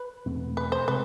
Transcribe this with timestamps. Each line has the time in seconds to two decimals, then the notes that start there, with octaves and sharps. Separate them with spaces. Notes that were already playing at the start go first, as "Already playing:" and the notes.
Already playing: B4
0.26 E2 B2 A3 C4
0.57 B4
0.72 C5
0.88 C3 G#3 C4 B4